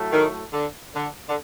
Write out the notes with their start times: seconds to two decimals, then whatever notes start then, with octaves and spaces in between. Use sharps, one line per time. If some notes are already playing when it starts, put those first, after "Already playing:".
Already playing: A2 F#3 A3
0.11 D#3
0.52 D3
0.94 D3
1.28 D3